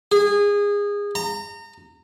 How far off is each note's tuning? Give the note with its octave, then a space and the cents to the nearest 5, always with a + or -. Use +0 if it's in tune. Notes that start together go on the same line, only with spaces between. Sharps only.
G#4 -25
A#5 -30